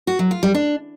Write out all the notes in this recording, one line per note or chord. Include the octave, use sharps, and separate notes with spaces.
F#4
F#3
F4
G3
D4